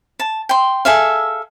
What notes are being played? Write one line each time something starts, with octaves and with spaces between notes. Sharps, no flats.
A5
G5 C6
G#4 A4 E5 F5